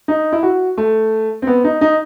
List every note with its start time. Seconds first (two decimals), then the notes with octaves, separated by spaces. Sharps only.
0.08 D#4
0.32 E4
0.43 F#4
0.77 A3
1.42 C4
1.47 B3
1.64 D#4
1.81 D#4